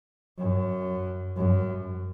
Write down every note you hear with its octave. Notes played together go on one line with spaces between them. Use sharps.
F#2
F#2